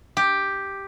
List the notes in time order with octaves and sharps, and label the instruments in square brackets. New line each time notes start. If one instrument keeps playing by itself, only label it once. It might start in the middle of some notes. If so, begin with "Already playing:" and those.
[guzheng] G4